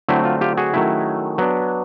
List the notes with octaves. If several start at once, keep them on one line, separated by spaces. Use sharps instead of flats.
D3 F#3 A3 C4 E4
F4
F4 G4
F#4 G#4
D#3 F#3 A3 C#4 E4
F#3 B3 D4